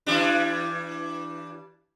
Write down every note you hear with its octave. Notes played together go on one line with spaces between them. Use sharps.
E3 G3 D4